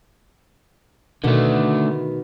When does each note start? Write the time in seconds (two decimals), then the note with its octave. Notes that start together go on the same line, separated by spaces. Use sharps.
1.24 B2 D3 D#3 A3 B3